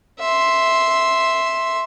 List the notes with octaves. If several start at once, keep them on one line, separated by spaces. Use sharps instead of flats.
E5 C6